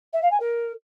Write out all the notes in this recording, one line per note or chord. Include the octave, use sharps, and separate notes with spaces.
E5
F5
G#5
A#4